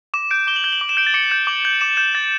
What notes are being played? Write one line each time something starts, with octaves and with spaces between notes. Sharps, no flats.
D6 E7
G6 D7
D6 G7
F#7
G6 G7
F#7
D6
E7
G6 D7
A6
D6 C#7
G6 E7
D6 F#7
G6 F#7
D6 E7
G6 E7
D6 A6